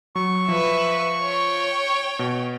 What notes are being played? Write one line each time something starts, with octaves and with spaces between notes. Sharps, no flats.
F#3 C#6
F3 B4 E5
C#5 G5
B2